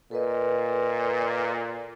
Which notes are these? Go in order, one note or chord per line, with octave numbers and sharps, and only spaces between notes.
A#2 A4 B4 D#5